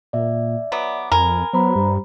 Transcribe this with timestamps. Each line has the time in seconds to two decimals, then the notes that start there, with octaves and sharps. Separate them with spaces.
0.13 A#2 D5 E5
0.72 F#3 B3 D6
1.12 F2 A#4 G#5 B5
1.53 F#3 B3 C5 A#5 B5
1.76 G2 G3